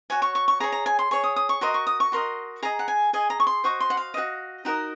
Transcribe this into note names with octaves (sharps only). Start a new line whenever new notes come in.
F#4 C#5 G#5
C#6
C#6
C#6
G#4 C#5 A#5
A#5
G#5
C6
G#4 C#5 C#6
D#6
D#6
C#6
F#4 A#4 D#5 C6
C#6
D#6
C#6
F#4 A#4 D#5 C6
G#4 D#5 A#5
F#5
G#5
G#4 D#5 G#5
A#5
C#6
C6
F#4 C5 D#5 C#6
C6
F#5
F5
F#4 C5 D#5
D#4 F#4 A#4 D#5